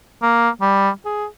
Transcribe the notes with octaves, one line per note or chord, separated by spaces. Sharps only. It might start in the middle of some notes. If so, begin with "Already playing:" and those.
A#3
G3
G#4